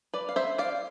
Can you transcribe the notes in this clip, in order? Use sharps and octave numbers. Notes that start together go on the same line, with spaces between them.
B4 D5
F5
C5 E5
D5 F5